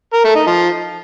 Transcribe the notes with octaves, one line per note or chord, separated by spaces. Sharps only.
A#4
A3
D#4
F3